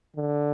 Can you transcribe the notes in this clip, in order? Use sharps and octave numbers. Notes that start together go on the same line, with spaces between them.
D3